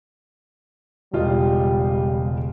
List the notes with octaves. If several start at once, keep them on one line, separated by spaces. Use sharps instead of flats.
E1 C#3 G3 F4 D#5